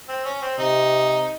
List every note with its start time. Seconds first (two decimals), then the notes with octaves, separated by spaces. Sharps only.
0.08 C4
0.25 C#4
0.42 C4
0.58 C3 D#4